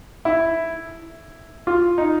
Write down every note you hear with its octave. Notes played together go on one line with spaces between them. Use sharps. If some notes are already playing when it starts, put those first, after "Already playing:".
E4
F4
D#4